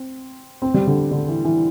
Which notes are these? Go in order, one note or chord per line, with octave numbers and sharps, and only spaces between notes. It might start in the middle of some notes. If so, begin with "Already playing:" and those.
Already playing: C4
C4
G3
D3
D3
E3
E3